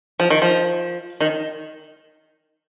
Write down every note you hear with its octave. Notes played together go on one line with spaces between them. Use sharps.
F3
D#3
F3
D#3